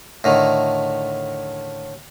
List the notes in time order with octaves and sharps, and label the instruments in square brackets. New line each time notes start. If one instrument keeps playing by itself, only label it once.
[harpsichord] A2 D3 D#3